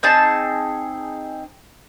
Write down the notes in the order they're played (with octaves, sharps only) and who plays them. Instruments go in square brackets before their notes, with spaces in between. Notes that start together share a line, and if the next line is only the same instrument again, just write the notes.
[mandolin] C4 D#4 G#4 A5